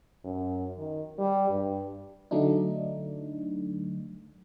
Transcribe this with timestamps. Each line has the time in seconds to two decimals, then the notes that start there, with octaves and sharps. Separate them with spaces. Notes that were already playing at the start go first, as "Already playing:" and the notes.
0.24 F#2
0.78 D#3
1.19 G3
1.49 G2
2.31 D3 F#3 A3 D4 D#4